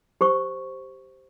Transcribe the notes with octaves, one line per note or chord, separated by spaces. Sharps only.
G4 C5 C#6